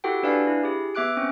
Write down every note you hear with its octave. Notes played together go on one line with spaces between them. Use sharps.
E4 F#4 G4 A4 F#5 G5
D4 B4 D5 F5 G#5
E4
G4 G#4
B3 E5 D6 F#6 D7
C4 C#4